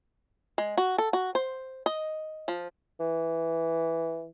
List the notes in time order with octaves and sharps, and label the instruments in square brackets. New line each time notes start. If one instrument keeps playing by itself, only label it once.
[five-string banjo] G#3
F#4
A4
F#4
C5
D#5
F3
[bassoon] E3